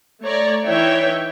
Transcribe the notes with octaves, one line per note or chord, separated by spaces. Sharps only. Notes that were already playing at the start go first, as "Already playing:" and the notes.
A3 C#5 D5 A#5
E3 D#4 C#5 E5 G5